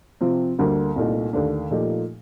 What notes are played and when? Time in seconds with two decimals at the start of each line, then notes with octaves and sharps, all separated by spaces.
0.21 C3 F3 C4 F4
0.58 D2 D3 G3 A#3
0.96 C2 A#2 A3 D#4
1.33 D#2 D3 A3 D4
1.71 A#2 F3 A3 D#4 G4